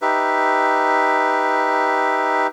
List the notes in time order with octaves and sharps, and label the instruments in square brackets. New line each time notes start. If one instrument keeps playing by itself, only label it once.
[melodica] D#4 G4 B4 E5